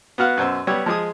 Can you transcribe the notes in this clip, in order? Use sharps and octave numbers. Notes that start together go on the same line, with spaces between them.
B3 F#4 F5 F#5
F#2 B2 C5 E6
G3 B3 C#5 E6
F3 G#3 G#4 D#6